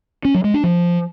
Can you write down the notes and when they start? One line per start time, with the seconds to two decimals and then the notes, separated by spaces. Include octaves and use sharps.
0.25 C#4
0.34 F#3
0.44 G#3
0.54 D4
0.64 F3